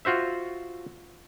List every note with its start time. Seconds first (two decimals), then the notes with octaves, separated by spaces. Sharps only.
0.05 F4 F#4 C5 E5